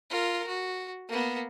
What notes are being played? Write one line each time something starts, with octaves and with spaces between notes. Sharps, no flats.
F4 A#4
F#4
A#3 B3